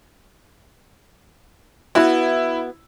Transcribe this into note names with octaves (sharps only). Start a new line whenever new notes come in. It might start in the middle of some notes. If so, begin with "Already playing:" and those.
B3 E4 F#4